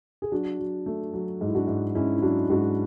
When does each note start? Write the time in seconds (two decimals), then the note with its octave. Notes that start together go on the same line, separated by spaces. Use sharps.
0.22 G#4
0.32 F#3 D4 F#4
0.59 F#3
0.86 A3
1.13 F#3
1.41 G#2
1.48 E4
1.55 D4 F#4
1.68 G#2
1.95 G#2 C#4 E4
2.17 E4
2.22 F#3 D4 F#4
2.50 G#2 D4 F#4